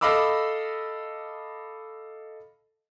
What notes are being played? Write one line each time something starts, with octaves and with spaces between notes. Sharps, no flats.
A4 D#5 F5 B5 D6 E6